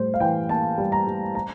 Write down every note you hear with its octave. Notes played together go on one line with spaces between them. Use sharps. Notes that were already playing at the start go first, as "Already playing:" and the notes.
Already playing: A2 G3 C5
F5
E3 G5
A#3 A5
G3
A#5
G3
A#5